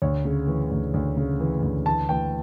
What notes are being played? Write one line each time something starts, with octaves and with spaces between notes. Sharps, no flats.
D2 C#5
C#3
E3
D2
D2
C#3
E3
D2
E3 A5
E3 G5